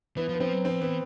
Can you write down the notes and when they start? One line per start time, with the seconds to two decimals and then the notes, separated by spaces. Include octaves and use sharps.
0.17 E3 B3
0.29 F3
0.34 B3
0.40 F3 C4
0.53 F#3
0.65 F3 C4
0.81 E3 B3